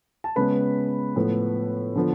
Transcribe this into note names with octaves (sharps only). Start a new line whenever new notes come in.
A5
C#3 G#3 B3 B4 B5
A2 F3 B3
D3 F3 B3